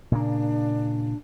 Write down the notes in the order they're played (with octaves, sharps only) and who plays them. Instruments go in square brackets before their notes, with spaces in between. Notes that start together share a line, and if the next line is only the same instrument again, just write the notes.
[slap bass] A#2 C#3 A#3 [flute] D4